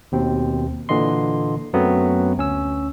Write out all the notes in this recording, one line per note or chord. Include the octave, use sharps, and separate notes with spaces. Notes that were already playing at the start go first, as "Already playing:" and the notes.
D#2 B2 C4
A#2 D3 E3 D#5 C6
F#2 F#3 A3 B3 C4
D2 C#4 E6